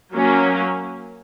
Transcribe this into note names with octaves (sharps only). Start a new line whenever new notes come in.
F#3 A#3 C#4